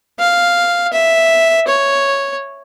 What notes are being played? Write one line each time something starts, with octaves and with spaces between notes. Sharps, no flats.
F5
E5
C#5